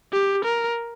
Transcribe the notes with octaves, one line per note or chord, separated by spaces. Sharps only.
G4
A#4